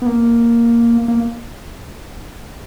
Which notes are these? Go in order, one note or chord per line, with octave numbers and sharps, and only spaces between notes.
B3
A#3
A#3